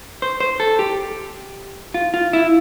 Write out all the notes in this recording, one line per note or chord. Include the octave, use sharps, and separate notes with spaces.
C5
C5
A4
G4
F4
F4
E4